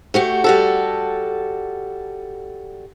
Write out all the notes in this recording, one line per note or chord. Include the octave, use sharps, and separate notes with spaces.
A3 F#4 G4
G3 F#4 A4